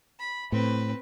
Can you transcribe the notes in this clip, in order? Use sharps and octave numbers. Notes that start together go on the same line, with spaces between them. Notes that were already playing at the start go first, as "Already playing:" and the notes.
B5
A2 C4 B4